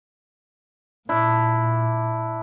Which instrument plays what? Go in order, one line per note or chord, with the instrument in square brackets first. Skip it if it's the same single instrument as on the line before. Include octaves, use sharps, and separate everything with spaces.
[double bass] A#2 [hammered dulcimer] D4 E4